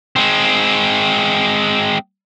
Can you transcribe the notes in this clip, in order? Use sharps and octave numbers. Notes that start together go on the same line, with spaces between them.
G#3 C4